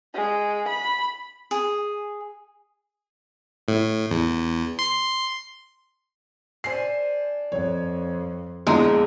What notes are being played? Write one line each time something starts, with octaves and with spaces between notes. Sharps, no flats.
G#3
B5
G#4
A2
E2
C6
D4 C5 G#5 C7
F2 C#5
A#1 E2 G#3 A#5